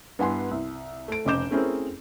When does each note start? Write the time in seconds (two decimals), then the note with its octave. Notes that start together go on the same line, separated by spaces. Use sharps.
0.19 G2 B3 E4 F#5 G#5 C6
0.51 C2
1.08 A3 D7
1.25 F1 C#3 D#5 D6 G6 E7
1.51 A3 C4 C#4 E4 G#4 A#4